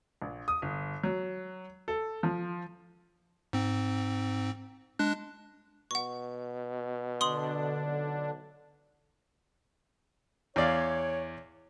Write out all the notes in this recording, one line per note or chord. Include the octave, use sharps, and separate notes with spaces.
A#1
D#6
G1
F#3
A4
F3
G#2 C4
G#3 D4 F#6
B2 F#5 C#6
D3 D4 C6 D#6 F#7
B1
E2 C#5 D5 F5